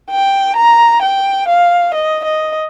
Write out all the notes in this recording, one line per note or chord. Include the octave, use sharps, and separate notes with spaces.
G5
A#5
G5
F5
D#5
D#5